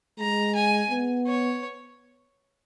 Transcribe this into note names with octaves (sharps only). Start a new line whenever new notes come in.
G#3 A#5
G#5
B3
C#5